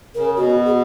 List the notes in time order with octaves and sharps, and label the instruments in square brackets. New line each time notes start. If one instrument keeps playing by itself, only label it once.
[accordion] C#3 [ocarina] A#4
[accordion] B2 [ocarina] F#4
[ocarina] G#4